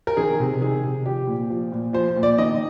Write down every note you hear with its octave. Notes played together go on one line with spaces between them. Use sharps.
A#4
D#3 G#4
C3
D#3 G#4
C3
F3 G4
A#2
F3
A#2
F3 C5
A#2
D5
D#3 D#5